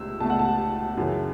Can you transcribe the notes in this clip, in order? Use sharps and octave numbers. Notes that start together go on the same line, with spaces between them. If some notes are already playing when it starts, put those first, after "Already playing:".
Already playing: C#2 A3 E6
C#2 B2 A3 A5
F#5
A5
F#2 C#3 E3